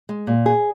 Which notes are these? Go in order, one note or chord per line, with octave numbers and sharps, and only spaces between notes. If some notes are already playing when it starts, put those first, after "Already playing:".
G#3
A#2
G#4